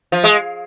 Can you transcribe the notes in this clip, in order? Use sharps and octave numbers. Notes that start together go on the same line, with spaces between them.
F3
G#3